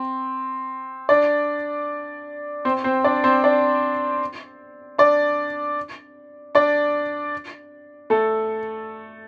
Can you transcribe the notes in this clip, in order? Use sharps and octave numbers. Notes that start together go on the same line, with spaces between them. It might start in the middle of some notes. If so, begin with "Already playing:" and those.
Already playing: C4
D4 D5
C4 C5
C4 C5
D4 D5
C4 C5
D4 D5
D4 D5
D4 D5
A3 A4